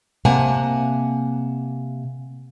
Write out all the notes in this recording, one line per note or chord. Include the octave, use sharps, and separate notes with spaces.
C3 A#3 F#5 G#5 A5